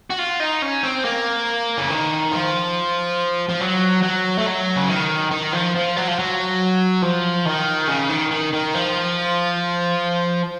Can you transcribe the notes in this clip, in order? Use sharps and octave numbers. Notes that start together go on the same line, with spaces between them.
F#4
F4
D#4
C#4
C4
A#3
C#3
D#3
F3
F3
F#3
F#3
A3
F#3
C#3
D#3
D#3
F3
F3
F#3
F3
F#3
F3
D#3
C#3
D#3
D#3
D#3
F3